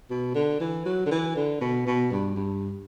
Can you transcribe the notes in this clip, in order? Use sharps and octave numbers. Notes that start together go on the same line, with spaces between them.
B2
D3
E3
F#3
D3
E3
D3
B2
B2
G2
G2